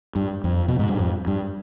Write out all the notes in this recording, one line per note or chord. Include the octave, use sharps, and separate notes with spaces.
G2
F2
B2
G#2
G2
F2
G2